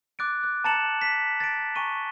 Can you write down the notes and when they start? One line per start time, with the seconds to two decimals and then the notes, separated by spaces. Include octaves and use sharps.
0.19 D6 F#6 A6 D7
0.44 F#6
0.64 A5 A#5 A6 C#7 E7 F#7
1.01 B6
1.40 A6 D7
1.75 G#5 A#5 C#6 D#7 G7